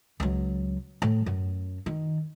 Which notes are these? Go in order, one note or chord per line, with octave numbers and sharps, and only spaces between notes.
C#2 F#3
A2
F#2
D#3